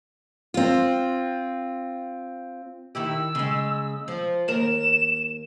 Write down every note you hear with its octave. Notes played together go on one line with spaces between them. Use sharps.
C4 F4
D#3 E4 G4 E6
C#3 G#3
F3
D#2 A#4 E7